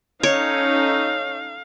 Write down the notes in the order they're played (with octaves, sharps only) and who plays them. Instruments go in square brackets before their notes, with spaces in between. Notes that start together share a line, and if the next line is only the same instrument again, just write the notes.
[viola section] C#4 D#4 A4 [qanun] C#5 [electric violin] F5